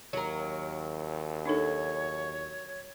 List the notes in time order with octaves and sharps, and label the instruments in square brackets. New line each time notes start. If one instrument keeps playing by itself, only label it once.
[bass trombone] D#2 [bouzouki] F#3 A#4
[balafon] D4 D#4 A4 [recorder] C#5